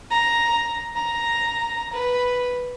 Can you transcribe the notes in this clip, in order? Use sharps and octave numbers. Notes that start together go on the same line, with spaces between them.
A#5
A#5
B4